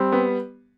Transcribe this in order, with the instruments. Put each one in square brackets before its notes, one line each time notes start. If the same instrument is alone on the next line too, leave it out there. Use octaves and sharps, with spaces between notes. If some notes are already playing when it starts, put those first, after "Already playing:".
Already playing: [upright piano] G3 [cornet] C4
[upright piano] B3